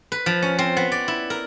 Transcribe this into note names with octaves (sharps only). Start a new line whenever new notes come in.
B4
F3
C#4
C4
B3
D5
E4
A#4